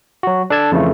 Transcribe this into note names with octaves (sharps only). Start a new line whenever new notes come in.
F#3 F#4
D4 A4 A5 G#6
F2 C#3 E3 A3